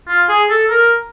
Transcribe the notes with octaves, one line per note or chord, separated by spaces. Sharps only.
F4
G#4
A4
A#4